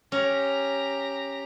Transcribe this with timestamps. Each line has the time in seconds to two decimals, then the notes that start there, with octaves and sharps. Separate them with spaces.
0.12 C#4 G4 A#5